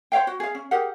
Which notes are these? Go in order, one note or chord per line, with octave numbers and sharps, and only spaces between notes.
C5 C#5 F5 G5
F#4
G#4 F5
C#4
G4 G#4 A#4 F#5